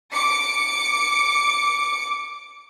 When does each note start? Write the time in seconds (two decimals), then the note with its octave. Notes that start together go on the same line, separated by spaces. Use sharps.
0.12 D6 C#7